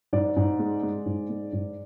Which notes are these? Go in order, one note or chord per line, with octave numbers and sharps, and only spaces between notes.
G#2 D5
G#2
G#3
G#3
G#2
G#3
G#2